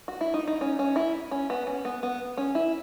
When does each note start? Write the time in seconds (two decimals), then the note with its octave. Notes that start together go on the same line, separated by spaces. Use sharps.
0.08 F#4
0.21 E4
0.34 D#4
0.47 D#4
0.61 C#4
0.79 C#4
0.96 E4
1.31 C#4
1.50 B3
1.67 C#4
1.85 B3
2.03 B3
2.37 C#4
2.55 E4